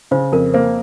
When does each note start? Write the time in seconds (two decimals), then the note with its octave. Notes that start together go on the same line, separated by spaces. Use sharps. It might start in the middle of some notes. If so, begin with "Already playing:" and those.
0.11 C#3 C5
0.32 F2 A#4
0.54 A#3 C5